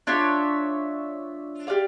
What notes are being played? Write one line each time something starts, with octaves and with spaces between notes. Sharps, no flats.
D4 F4 C#5 E5
G4 A#4 D5 F5